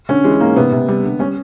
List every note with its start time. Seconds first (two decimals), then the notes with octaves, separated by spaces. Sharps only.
0.09 D3 C#4
0.24 E3 G#3
0.40 G#2 A#3
0.56 C3 B3
0.72 C3
0.88 G3
1.03 D3
1.19 G3 C#4